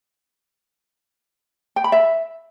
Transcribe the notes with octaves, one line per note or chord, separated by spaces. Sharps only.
G5
B5
E5